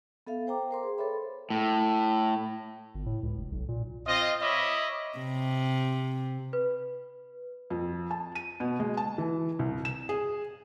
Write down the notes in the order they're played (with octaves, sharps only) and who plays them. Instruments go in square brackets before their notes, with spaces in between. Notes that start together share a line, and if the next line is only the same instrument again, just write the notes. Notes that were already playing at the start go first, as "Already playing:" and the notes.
[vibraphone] B3 A4 E5 F5
C5 G5 A#5 D6
A#4 C5 C6
G#4
A4 B4 C#5 E5 B5
[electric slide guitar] A2
[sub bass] G1
A2
C#2
F1
B1
A#2
[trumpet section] C4 F4 D#5
C#5 D#5 E5 B5 D6
[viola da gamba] C3
[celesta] B4
[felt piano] F2
A5
D#7
B2
G#3
A5
E3
C2
E7
G#4